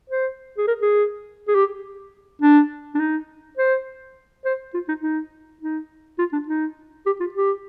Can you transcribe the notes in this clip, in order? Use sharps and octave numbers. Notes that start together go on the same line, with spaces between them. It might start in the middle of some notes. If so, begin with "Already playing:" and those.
C5
G#4
A#4
G#4
G#4
G4
D4
D4
D#4
C5
C5
F4
D#4
D#4
D#4
F4
D4
D#4
G4
F4
G4